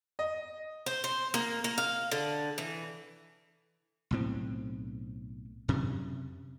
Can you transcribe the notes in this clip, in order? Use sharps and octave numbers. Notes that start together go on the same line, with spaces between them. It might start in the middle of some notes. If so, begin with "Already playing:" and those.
D#5
C5
C5
A#3
A#3
F5
D3
E3
B1 A2 C4
F#2 C3